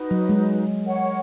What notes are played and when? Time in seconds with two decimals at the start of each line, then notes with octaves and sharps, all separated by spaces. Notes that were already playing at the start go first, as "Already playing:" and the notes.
Already playing: D#4 F#4 B4 D#5
0.11 F#3
0.29 G#3
0.83 A#4 C#5 F#5 C#6